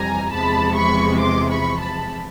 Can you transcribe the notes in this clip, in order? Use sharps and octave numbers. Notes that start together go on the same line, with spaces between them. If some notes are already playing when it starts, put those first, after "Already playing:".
Already playing: F2 C3 E3 G3 G#5 A#5
E2 C3 F3 G#3 A5 B5
B5 C#6
C6 D6
B5 C#6
A5 B5